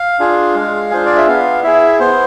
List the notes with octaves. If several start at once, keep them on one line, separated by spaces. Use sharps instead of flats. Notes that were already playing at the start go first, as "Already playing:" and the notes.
Already playing: F5
D4 F4 G#4
G#3
D4 F4 G#4 C5
D5
E5
B3 F5
E4 G#4 E5
B3 C5